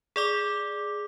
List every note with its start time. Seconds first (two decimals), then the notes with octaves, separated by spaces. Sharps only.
0.16 G#4 D5 D6